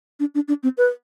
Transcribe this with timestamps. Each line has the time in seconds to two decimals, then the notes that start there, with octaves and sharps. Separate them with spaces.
0.20 D4
0.35 D4
0.48 D4
0.63 C4
0.78 B4